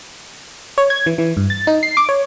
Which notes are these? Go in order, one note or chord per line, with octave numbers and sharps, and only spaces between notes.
C#5
G#6
E3
E3
G2
A6
D#4
C7
D6
C#5